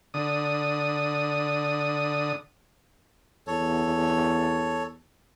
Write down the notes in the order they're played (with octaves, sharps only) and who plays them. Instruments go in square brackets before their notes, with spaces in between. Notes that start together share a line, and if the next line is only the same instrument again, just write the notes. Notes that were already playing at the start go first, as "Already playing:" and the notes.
[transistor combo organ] D3 D#6
[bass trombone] E2 [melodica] A4 C#5